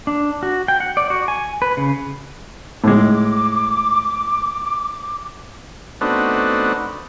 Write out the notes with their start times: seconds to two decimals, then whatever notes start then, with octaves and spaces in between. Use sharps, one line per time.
0.07 D4
0.43 F#4
0.68 G5
0.80 F#5
0.97 D5
1.10 F#4
1.28 G#5
1.62 B4
1.77 C#3
2.84 A2 G#3 D6
6.01 A3 B3 C4 D4 D#4 F#4